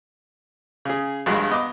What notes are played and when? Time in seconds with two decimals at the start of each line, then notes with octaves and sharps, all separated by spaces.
0.85 C#3 G#4
1.26 A#1 G2 G#3 F#4
1.50 B3 D#5 D6